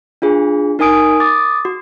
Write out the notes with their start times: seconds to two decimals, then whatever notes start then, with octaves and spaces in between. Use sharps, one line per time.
0.22 D4 F4 G#4
0.79 D#4 A#4 G#5 D#6 D7
1.20 D6 D#6 A6
1.65 F#4